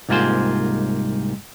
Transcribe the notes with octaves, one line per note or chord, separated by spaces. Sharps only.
C2 G#2 A#3 F4 G#4 C5